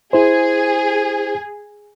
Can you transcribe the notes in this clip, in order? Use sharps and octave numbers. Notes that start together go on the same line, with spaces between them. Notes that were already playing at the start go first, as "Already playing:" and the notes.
E4 G#4 C5